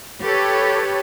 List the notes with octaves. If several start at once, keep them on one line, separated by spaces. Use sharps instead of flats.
G4 A4 B4 C#5